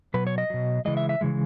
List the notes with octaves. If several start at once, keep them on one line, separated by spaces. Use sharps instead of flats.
B2 F#3 B4
C#5
D#5
B2 F#3
C#3 E3 G#3 D#5
E5
E5
C#3 E3 G#3